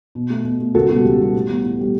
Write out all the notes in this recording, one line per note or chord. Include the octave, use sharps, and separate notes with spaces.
B2
A3
B2
A3
C#2 F#4 A4
B2 G3 B3 F#4
C#2 G4
B2 G3 B3
A2
G3 B3
A2
G3 B3